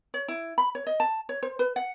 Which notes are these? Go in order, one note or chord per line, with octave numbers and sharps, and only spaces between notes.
C#5
E4
B5
C#5
D#5
A5
C#5
C5
B4
F#5